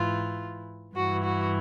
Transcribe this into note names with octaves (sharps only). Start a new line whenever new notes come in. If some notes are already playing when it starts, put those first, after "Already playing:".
Already playing: G#2 E3 F4
G2 E3 F#4
F#4